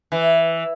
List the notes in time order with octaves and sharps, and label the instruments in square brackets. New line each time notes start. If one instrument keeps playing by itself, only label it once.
[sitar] E3